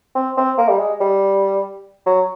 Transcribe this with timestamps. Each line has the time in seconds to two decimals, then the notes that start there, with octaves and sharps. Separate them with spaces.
0.15 C4
0.37 C4
0.58 A#3
0.69 G3
0.79 G#3
1.00 G3
2.06 F#3